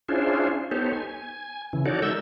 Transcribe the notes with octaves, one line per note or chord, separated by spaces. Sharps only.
C#4 D4 E4 F4 G#4 C5
B3 D#4 G4 A4 C5 C#5
G#5
C#3 E3
D#4 F#4 A4 C#5 D5
G#3 A#4 E5 E6 G6